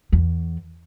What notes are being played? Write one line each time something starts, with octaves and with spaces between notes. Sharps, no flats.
E2